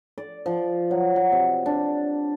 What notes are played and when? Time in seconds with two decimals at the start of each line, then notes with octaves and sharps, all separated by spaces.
0.18 D5
0.46 F3
0.91 F#3
1.16 F#3
1.32 C3
1.66 D4